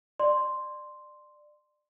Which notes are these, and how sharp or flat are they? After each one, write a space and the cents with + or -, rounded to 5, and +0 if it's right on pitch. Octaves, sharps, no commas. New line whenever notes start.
D5 +25 C6 +0